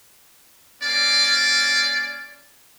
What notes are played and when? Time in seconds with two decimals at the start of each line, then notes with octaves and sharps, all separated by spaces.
0.83 A#3 C#4 D5